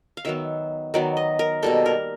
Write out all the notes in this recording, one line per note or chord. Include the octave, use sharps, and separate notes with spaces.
F5
D#3 F#3 B3 E5
D#3 F#3 B3 D5
D#5
A#4
B2 G3 A#3 A4
A#4